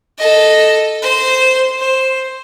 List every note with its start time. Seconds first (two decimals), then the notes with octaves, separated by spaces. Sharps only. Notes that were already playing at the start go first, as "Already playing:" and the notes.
0.18 A4 D#5
1.02 C5
1.79 C5